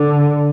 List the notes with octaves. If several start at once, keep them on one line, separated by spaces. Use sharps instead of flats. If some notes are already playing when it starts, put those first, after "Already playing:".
Already playing: D3